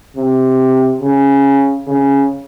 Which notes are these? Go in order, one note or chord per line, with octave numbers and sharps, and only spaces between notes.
C3
C#3
C#3